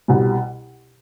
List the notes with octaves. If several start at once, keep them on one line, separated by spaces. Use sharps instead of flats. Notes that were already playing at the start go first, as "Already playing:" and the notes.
C2 B2 G3